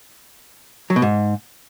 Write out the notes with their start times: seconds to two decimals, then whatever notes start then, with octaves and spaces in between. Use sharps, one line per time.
0.90 F#3
0.96 B2
1.02 G#2